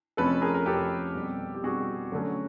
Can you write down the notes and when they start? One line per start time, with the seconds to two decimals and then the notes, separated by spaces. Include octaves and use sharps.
0.17 F2 C3 F3 A3 C#4 A4 B4
0.42 G#4 A#4
0.54 A#4
0.66 F2 C3 F3 A3 C#4 G4 A4
1.15 B2 G3 C4
1.54 G4
1.64 B2 G3 C4 F#4 G#4
2.12 D3 F#3 A3 C#4